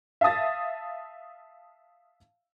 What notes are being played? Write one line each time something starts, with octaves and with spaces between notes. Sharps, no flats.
E5 F5 A5 D#6 A6